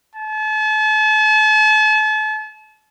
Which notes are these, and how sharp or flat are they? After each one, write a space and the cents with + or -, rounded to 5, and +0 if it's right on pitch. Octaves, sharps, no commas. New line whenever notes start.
A5 -40